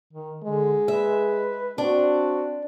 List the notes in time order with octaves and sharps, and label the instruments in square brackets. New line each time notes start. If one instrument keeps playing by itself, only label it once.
[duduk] D#3
[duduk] D3 [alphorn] G#3
[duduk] B4 [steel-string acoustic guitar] E5
[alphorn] C4 [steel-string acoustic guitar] D4 [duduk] F#4